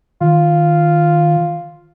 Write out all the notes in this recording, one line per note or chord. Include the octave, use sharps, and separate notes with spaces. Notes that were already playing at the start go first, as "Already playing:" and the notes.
D#3 F4